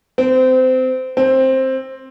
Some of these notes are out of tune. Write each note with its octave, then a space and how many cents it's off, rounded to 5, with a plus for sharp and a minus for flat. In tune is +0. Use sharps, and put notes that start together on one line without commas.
C4 -25
C4 +10